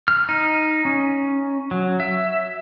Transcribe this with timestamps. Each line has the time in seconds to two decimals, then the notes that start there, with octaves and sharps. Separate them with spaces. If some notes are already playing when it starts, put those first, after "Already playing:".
0.08 F6
0.29 D#4
0.85 C#4
1.71 F#3
2.00 E5